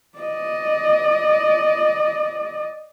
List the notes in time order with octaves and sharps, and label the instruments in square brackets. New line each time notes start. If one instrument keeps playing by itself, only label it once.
[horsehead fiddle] D5 D#5